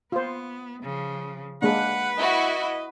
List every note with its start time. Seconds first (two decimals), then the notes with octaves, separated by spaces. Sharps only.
0.12 B3 F4 C5
0.83 C#3 F3
1.62 G#3 A#3 D4 B4 F#5
2.17 E4 F#4 D#5